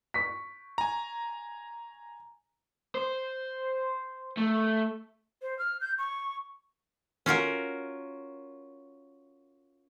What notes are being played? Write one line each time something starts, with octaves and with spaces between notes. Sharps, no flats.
C#6 B6
G#5 A#5
C5
A3
C5
F6
G6
C#6
C#4 F4 F#4 A#4